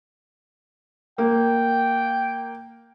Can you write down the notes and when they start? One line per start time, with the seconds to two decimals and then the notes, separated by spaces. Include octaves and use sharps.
1.18 A#3 G5